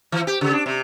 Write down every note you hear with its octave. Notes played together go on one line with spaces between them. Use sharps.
E3
G4
C#3
D4
C3